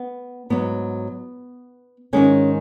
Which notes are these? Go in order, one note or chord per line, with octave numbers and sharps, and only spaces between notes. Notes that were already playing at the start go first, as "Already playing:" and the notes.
Already playing: B3
G#2 F#3 B3
G#2 D#3 G#3 C#4